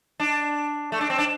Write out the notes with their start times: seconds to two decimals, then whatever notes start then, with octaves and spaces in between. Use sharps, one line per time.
0.20 D4
0.92 A3
1.01 D4
1.10 C4
1.18 D4